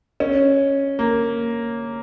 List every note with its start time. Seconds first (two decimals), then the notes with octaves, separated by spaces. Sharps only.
0.20 C#4
0.99 A#3